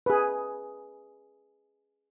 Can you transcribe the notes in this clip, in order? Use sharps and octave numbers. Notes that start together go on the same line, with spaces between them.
G#4 B4